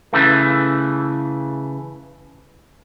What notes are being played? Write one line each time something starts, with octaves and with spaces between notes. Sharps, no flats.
C#3 E3 A3